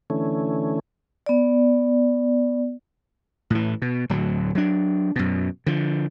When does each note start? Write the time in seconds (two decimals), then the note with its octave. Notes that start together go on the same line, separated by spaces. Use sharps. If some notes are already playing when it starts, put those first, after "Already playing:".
0.10 D3 E3 A3 C#4
1.26 B3 D5
3.50 A2 E3
3.82 B2
4.10 D1 D2 F#3
4.55 F#3 D4
5.16 F#2 B2
5.66 D3 F3